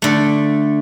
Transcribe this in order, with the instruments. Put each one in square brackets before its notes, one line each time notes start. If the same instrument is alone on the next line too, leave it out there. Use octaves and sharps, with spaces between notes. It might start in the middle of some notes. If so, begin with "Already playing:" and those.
[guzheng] D3 A3